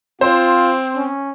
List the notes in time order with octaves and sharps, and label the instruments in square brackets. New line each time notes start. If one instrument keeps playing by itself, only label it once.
[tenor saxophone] C4 [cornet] F4 [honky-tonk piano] C5
[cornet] C#4